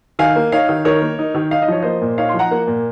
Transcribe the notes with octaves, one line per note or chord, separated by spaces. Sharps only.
D#3 F5 G#5
A#3
D#4 C#5 F5
D#3
D#3 A#4 C#5
A#3
D#4
D#3
D#4 F5
D#5
F3 C#5
A#3 C5 D#5
A#2
D#4 C#5 F5
F3 C6
F#5 A#5
A#3
A#2